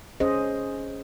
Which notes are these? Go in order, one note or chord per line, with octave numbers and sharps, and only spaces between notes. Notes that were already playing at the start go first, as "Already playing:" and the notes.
C#4 G#4 C5 D#5